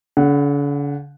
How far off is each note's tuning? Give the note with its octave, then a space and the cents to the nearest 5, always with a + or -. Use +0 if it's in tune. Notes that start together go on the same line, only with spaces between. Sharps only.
D3 -45 F#5 +0